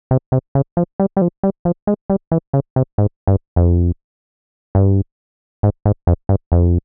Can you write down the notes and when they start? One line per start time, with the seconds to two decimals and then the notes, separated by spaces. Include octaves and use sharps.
0.11 C3
0.32 C3
0.55 C#3
0.77 F3
1.00 G3
1.17 G3
1.21 F3
1.43 G3
1.65 F3
1.87 G#3
2.10 G3
2.32 E3
2.53 C#3
2.76 C3
2.98 G#2
3.27 G2
3.56 F2
4.75 G2
5.63 G#2
5.85 G#2
6.07 F2
6.29 G2
6.52 F2